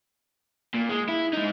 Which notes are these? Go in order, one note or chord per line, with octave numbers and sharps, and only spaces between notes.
A#2
G#3
E4
G#3 D#4